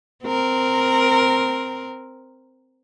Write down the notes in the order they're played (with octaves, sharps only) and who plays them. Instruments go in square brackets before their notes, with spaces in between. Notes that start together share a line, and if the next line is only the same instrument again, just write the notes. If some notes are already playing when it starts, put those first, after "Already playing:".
[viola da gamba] C4 A#4